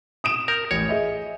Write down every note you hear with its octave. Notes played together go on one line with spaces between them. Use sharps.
D#6 D7 E7
A#4 G6
A1 C#5
G#4 D#5 E5